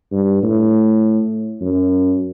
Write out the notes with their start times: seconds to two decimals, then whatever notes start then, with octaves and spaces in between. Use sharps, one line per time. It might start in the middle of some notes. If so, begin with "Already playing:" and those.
0.12 G2
0.43 A2
1.61 F#2